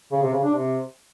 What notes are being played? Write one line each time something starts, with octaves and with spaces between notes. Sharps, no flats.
C#3
C3
C#3
D4
C3